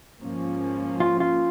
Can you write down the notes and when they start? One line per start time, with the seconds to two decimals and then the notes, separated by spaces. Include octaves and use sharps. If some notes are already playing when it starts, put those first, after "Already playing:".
0.20 G#2 F3 A#3 C#4
1.00 F4
1.20 F4